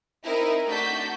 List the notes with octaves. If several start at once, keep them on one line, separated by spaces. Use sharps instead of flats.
C4 D#4 E4 A#4
A3 D4 F#4 A5 G6 B6